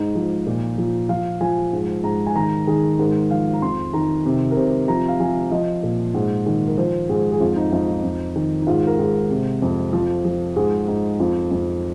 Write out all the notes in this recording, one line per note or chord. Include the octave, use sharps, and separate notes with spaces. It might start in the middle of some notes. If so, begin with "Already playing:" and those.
Already playing: G#2 D#4
F3
A#2
F3
F3 F5
F3 G#5
G#2
G#2 A#5
G#5
D#3 A#5
D#3 G#4
G#2 A#4
F3 F5
A#5
F2 C6
D#3 A#5
C3
A#4
C3 C5
F3 A#5
F5
F3 G#5
F3 D#5
A#2
G#2
D#3
A#4
F3 C5
G#2 G#4
G#4
F2 F4
D#4
F2 F4
D#4
F2
D#3
D#4
G#2 F4
A#4
G#2 G#4
C3
F2
F3
F3
G#2 G#4
G#2 D#4
F2 F4
F2